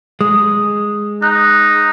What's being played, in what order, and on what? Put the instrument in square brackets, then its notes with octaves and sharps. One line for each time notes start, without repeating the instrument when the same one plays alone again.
[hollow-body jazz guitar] G#3 [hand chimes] D#6
[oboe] D#4 [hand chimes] F#6